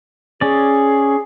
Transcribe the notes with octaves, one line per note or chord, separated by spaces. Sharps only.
C#4 G#4 D5